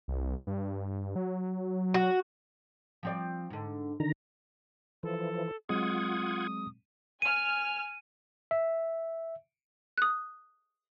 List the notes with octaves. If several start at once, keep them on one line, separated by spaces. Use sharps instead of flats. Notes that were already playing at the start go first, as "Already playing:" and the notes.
C2
G2
F#3
F#4
F3 C4 D5
G#2 D3
D3 D#3 A#5
E3 F3 A4
F#3 G#3 C4 F4 F#5 D#6 G#6
G#5 F6 D#7
E5
D#6 F#6